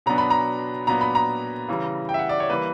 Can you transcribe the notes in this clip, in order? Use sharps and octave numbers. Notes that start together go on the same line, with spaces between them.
B2 F#3 B3 D4 A#5
B5
A#5
A#2 F#3 B3 D4 A#5
B5
A#5
C#3 E3 G3
G5
E5
F#5
D5
C#5
E3 G3 A#3 B4